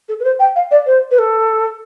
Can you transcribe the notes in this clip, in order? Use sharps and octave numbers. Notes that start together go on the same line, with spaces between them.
A4
B4
C5
G5
F5
D5
C5
B4
A4